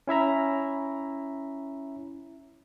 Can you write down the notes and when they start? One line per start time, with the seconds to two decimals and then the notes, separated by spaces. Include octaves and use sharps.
0.07 C#4 E4 E5 A#5